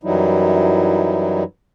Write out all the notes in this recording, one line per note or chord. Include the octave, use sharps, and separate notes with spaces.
F#2 E3 F#3 G3 D#4 E4